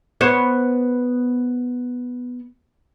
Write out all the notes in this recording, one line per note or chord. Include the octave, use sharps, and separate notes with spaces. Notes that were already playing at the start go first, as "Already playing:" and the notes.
B3 C5 C#5